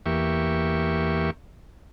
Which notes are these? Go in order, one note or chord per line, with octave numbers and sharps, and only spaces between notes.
E2 A#3 G4 E5 C#6